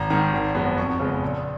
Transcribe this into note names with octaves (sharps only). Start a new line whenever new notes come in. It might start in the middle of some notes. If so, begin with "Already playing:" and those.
Already playing: G#1 A#5
G#2 D#3 A#5
G#1
F#2 F3 G#3 B3
F2 C#6
C#3 G#3 B3
A#1